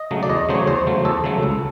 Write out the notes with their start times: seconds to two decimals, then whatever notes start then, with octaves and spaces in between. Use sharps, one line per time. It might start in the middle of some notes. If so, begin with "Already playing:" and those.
Already playing: D#5
0.11 C#3 F#3 A3
0.23 D5
0.29 E2 D#5
0.49 C#3 F#3 A3 C5
0.55 C#5
0.67 E2 C5
0.86 C#3 F#3 A3
1.05 E2 A4
1.24 C#3 F#3 A3
1.43 C#2